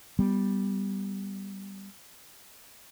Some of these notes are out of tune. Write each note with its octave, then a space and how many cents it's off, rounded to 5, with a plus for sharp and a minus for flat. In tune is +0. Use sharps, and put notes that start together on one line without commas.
G3 +0 B3 +0